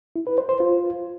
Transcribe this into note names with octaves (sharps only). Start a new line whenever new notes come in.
E4
B4
C5
C5
F4